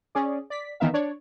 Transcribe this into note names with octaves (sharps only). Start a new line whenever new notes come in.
C#4 G#4 D5
D5 B6
D#3 E3 B3 A#4 E5 F5
D4 C#5 D5